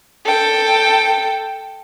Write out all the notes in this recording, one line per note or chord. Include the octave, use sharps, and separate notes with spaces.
A4 G5